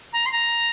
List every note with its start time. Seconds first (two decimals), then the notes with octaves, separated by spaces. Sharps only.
0.12 A#5
0.26 C6
0.31 A#5